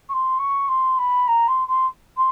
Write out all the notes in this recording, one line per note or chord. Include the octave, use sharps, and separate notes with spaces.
C#6
C6
C#6
C6
B5
A#5
C6
C6
C6